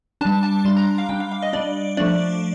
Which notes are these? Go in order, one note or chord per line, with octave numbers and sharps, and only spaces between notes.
G3 D4 A5
A5
G3 D4 C6
A#5
F5
G3 D4 G5
F5
F5
D#5
G3 D4 D5
F3 A3 D4 D5